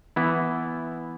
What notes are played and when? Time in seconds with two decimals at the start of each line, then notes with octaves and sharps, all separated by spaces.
0.16 E3 B3 E4